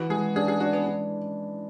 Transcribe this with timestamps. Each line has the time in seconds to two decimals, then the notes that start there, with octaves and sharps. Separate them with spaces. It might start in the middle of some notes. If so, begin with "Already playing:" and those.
Already playing: E3 F#4
0.10 G#3 G#4
0.36 D4 G#4
0.48 G#4
0.60 D4 F#4
0.73 B3
0.86 D4